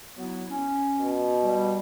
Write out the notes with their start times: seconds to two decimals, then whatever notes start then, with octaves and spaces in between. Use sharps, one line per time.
0.15 F#3 B3 E4
0.50 C#4
0.98 B2
1.42 G3